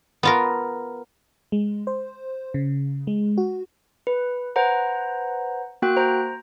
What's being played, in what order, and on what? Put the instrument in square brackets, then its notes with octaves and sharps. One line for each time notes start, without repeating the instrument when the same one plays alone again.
[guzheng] B3 F4 A#4
[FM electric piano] G#3
C5
C#3
G#3
F#4
[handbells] B4
B4 C5 F#5 A#5
A#3 F#4 G5 F#6
C5 A#5